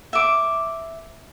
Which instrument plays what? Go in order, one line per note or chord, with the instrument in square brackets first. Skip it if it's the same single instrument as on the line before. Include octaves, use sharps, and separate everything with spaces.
[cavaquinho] E5 D6